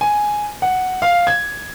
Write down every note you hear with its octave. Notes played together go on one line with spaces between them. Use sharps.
G#5
F#5
F5
G#6